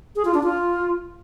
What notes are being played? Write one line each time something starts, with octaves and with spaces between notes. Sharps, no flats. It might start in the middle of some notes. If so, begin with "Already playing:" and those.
G#4
F4
D4
F4